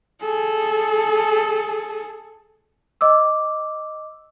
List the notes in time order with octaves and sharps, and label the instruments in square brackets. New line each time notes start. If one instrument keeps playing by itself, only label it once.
[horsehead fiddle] G#4 A4
[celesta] D#5 D6 E6